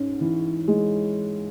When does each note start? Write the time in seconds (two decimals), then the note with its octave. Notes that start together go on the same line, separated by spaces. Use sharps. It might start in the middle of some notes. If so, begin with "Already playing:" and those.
Already playing: G#2 C#4
0.21 E3
0.68 G#3